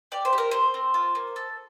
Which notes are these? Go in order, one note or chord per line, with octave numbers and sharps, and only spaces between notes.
G4 D5
C5
G4
A#4
C4 C5
C4
F4
A#3
A4